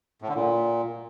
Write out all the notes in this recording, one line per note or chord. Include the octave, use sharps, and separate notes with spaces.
A2
D3
A#2